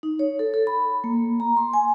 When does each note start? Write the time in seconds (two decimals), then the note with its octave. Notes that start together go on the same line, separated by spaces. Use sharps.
0.03 D#4
0.19 C#5
0.39 A4
0.54 A4
0.67 B5
1.04 A#3
1.40 A#5
1.57 C6
1.74 G#5